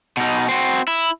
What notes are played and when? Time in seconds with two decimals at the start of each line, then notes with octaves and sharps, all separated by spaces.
0.17 B2 D#4
0.48 C4 F#4
0.88 E4